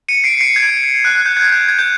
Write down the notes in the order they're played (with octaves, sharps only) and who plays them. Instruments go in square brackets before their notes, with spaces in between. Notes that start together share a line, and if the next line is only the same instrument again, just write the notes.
[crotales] C#7 D#7
C7 D7
C7 D7
G#6
F#6
F#6
G6
G#6
G6
G#6
G6